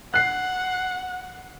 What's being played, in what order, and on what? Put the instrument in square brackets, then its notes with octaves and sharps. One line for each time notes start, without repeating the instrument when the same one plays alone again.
[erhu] F#5 [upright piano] F#6 C7